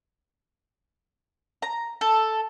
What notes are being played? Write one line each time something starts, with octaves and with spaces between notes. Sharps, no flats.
A#5
A4